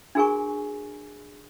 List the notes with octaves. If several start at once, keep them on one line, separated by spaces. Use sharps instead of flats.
D4 F#4 G#4 A#4 G#5 C#6